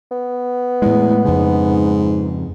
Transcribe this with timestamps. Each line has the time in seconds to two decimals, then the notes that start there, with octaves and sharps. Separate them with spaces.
0.11 B3
0.82 E2 A2 G#3
1.25 F2 G#2 C#3